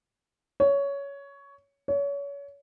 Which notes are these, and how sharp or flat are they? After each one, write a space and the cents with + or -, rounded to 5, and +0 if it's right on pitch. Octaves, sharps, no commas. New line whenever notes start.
C#5 +15
C#5 +30